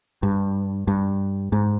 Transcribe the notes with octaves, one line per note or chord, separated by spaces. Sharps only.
G2
G2
G#2